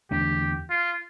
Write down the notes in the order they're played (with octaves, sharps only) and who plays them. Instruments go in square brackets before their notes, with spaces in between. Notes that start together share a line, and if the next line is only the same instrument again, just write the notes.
[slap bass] E2 D3 A3 D4 [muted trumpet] G4
[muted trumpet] F4